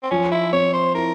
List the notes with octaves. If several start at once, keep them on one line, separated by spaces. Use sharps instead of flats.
C4
F3 C#4
E4
C4 C#5
C5
E4 A#4